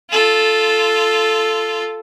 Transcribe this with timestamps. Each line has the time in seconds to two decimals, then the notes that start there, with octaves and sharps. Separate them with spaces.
0.10 F4 A4